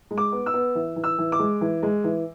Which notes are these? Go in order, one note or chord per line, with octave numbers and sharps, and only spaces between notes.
G#3
D6
B3
E6
B3
E3
E3
E6
E3
D6
G#3
E3
G#3
E3